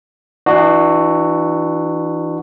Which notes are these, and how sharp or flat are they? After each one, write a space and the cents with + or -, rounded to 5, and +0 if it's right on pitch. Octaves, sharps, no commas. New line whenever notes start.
E3 +0 D4 +40 F#4 +0